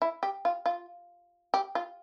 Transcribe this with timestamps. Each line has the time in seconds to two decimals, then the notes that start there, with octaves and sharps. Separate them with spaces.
0.02 E4
0.23 G4
0.45 F4
0.66 F4
1.54 G4
1.75 F4